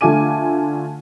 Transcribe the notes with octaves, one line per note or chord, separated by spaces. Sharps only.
D3 A3 F4 G#5 D6 D#7